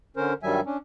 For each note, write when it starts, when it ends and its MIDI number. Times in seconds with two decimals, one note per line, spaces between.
0.17 0.33 50
0.17 0.33 61
0.17 0.33 70
0.17 0.33 72
0.43 0.60 43
0.43 0.60 51
0.43 0.60 54
0.43 0.60 55
0.43 0.60 76
0.43 0.60 80
0.66 0.77 61
0.66 0.77 62